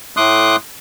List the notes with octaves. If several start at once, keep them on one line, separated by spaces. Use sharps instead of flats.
A2 A3 C6 D6 D#6 F#6